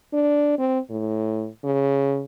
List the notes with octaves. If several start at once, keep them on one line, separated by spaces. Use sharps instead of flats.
D4
C4
A2
C#3